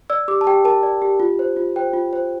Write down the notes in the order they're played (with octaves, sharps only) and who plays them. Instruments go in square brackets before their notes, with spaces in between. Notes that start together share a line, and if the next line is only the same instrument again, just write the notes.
[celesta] D5 E6
G4 D6
A5
G4 G5
A#4 A5
D5
G4
F4
C5
F4
C5 G5
F4
C5